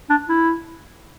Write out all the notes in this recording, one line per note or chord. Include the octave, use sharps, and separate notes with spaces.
D4
E4